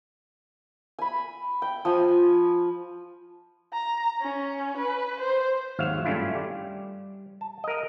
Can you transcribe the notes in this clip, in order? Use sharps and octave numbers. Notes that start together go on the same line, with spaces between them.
G#5 B5
G5
F3 G#5
A#5
C#4
B4
C5
G#1 D#2 F#3 E5 F5
G2 A3 C#4 D4 E4 F4
G3
A5
A#4 D#5